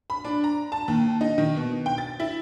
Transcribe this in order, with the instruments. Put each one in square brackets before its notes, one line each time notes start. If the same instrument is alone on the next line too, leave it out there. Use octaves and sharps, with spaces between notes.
[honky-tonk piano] B5
D4
A#5
A5
D#2
D#4
D#3
B2
G5
A6
E4